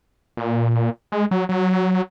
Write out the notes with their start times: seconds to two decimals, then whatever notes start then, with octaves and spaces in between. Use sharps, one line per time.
0.37 A#2
1.12 G#3
1.31 F#3
1.49 F#3